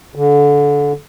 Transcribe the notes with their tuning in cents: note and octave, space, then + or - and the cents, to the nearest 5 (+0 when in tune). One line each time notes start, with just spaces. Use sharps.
D3 -25